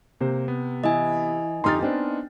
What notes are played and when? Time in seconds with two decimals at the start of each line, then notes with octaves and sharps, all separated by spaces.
0.20 C3 A#3 C5
0.48 B3
0.84 E3 E4 D#5 G#5
1.64 F2 D3 D#4 G4 A#5 C6 F6 A6
1.82 B3 C4 D4 D#4